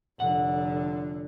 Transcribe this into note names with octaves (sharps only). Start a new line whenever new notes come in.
F1 D3 F#5